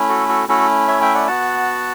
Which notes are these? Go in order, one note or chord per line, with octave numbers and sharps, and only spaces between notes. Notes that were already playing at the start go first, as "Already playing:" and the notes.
Already playing: A3 C#4 E4
F#4 A4
F#4 A4
A3 C#4 E4 F#4 A4
C#5 E5
E5 G5
D5 F#5
B3 F#4 F#5 A5